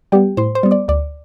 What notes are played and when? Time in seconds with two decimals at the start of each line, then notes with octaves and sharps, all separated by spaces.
0.12 G3 B3 G4 G5
0.37 A2 C5 C6
0.55 C5 C6
0.63 G3 B3
0.71 D5 D6
0.88 D2 D5 D6